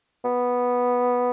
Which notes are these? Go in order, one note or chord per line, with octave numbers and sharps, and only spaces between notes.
B3